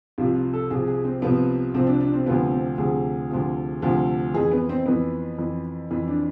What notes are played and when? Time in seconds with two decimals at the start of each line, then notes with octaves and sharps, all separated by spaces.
0.18 C2 C3 F3 F4
0.36 F4
0.53 A4
0.70 C2 C3 F3 G#4
0.87 G#4
1.05 C4
1.22 C2 C3 F3 B3
1.74 C2 C3 F3 C4
1.87 D4
2.01 D4
2.13 C4
2.26 D2 C3 F3 B3
2.52 C4
2.78 D2 C3 F3 G#4
3.30 D2 C3 F3
3.82 D2 C3 F3
4.34 F2 E3 G#4
4.51 B3
4.69 C4
4.86 F2 E3 B3
5.38 F2 E3
5.91 F2 E3
6.08 D4